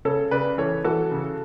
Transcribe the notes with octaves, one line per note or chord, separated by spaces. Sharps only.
C#3 A4 C#5
C#3 B4 D5
E3 A4 C#5
E3 F#4 A4
C#3